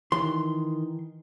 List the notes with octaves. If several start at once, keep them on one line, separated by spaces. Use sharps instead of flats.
D#3 E3 C6